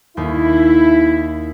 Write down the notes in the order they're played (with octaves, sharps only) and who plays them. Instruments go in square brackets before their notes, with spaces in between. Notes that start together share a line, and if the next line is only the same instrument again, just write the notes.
[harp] D#2 [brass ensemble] E4